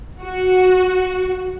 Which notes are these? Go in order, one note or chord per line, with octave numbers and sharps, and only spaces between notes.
F#4